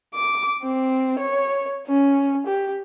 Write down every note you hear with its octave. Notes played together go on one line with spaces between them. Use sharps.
D6
C4
C#5
C#4
G4